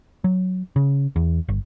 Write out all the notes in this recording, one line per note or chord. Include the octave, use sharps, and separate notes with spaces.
F#3
C#3
E2
G1